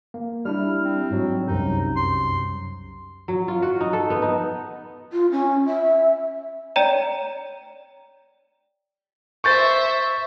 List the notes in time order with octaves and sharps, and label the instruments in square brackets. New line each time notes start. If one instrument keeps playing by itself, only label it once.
[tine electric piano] A#3
[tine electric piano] G3 D4 E4 [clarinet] F6
[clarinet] C4
[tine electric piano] G#2 F#3
[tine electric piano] C2 F#2 C3 [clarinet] D#4
[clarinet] C6
[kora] F#3
F4
F#4
D#4
A4
B3
D#4
[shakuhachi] F4
C#4
E5
[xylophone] C#5 D5 G5 A#5 D#7 E7
[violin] C5 E5 [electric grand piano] C#6 G6 A6